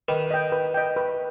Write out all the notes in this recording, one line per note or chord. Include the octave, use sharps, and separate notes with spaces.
D#3 B4
D#5 G5
B4
D#5 G5
B4